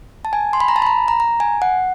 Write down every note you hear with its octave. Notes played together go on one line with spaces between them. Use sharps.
A5
G#5
C6
B5
A#5
A5
B5
A#5
A#5
A#5
G#5
F#5